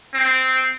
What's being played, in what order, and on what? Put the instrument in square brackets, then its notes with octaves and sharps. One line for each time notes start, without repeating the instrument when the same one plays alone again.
[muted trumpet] C4